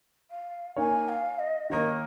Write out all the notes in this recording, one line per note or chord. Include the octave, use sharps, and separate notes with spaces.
F5
A#3 D#4 C#5 G#5
F5
D#5
D#3 A#3 D#4 A#4 C#5 D#5